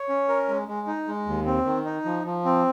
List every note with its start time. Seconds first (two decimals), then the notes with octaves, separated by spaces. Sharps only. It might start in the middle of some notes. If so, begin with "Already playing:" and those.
Already playing: C#5
0.09 C#4
0.28 A#4
0.48 G#3
0.68 G#3
0.87 D#4
1.08 G#3
1.26 D#2
1.46 C4
1.65 D#3
1.85 D#4
2.05 F3
2.25 F3
2.45 C4